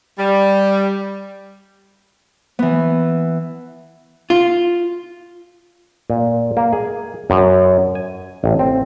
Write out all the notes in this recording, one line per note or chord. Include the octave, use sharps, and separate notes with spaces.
G3
E3 B3
F4
A#2
A#3
G#4
F#2
G#5
A1
C4